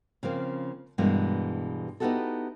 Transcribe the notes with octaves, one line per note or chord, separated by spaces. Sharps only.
C#3 F3 A#3 C4
G2 B2 E3 G#3 A#3
B3 D#4 E4 F#4 G4 A4